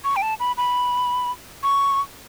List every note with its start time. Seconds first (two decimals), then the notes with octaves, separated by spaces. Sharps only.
0.04 C#6
0.16 G5
0.22 A5
0.40 B5
0.57 B5
1.63 C#6